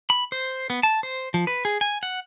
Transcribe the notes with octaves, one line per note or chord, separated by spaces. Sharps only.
B5
C5
B3
A5
C5
F3
B4
G#4
G#5
F#5